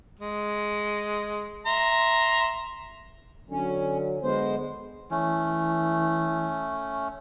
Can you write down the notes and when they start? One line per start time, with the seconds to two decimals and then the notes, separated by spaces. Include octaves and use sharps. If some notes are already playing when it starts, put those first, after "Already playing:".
0.19 G#3
1.66 E5 A#5 C6
3.50 D3 F#3 C#4
4.22 D3 G#3 B3 C5
5.11 E3 A3 C#4